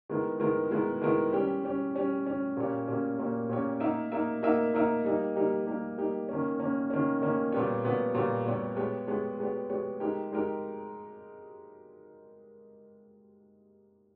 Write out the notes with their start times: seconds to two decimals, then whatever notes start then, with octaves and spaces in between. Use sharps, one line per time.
0.09 D#3 G#3 B3 E4 A#4
0.40 D#3 G#3 B3 E4 A#4
0.71 D#3 G#3 B3 E4 A#4
1.02 D#3 G#3 B3 E4 A#4
1.32 G3 C#4 G4
1.64 G3 C#4 G4
1.95 G3 C#4 G4
2.25 G3 C#4 G4
2.56 A#2 A#3 C#4 G4 C#5
2.88 A#2 A#3 C#4 G4 C#5
3.19 A#2 A#3 C#4 G4 C#5
3.49 A#2 A#3 C#4 G4 C#5
3.80 A#3 D#4 A#4 E5
4.12 A#3 D#4 A#4 E5
4.43 A#3 D#4 A#4 E5
4.74 A#3 D#4 A#4 E5
5.04 G3 A#3 D#4 G4
5.36 G3 A#3 D#4 G4
5.67 G3 A#3 D#4 G4
5.98 G3 A#3 D#4 G4
6.29 D#3 A#3 C#4
6.59 D#3 A#3 C#4
6.90 D#3 A#3 C#4
7.22 D#3 A#3 C#4
7.52 A#2 G3 B3 G4 C#5
7.84 A#2 G3 B3 G4 C#5
8.14 A#2 G3 B3 G4 C#5
8.46 A#2 G3 B3 G4 C#5
8.76 G#3 B3 G4 C#5
9.07 G#3 B3 G4 C#5
9.39 G#3 B3 G4 C#5
9.69 G#3 B3 G4 C#5
10.00 G#3 D#4 G4 A#4
10.32 G#3 D#4 G4 A#4